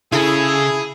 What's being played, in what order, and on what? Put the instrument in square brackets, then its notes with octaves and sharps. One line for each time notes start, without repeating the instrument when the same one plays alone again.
[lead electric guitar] C#3 [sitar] E4 A4 [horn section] G#4